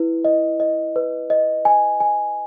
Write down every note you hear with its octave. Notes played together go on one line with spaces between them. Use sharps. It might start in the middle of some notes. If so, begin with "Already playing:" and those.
Already playing: E4 B4
D#5
D#5
B4
D#5
G#5
G#5